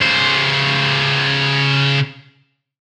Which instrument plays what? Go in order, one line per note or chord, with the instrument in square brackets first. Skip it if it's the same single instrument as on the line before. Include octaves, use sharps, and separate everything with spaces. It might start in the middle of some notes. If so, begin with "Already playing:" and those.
[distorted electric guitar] C#3 C5